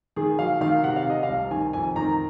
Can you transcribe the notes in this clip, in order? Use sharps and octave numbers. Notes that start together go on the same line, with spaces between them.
D#3 G#4
F#3 F5
D#3 F5
C3 F#5
F5
C3 D#5
F5
C2
D#3 G#5
F2 G#5
D#3 A#5